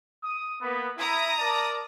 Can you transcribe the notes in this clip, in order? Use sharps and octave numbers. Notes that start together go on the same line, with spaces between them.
D#6
A#3 B3
E4 A#5 D#6
A#4 D5 A5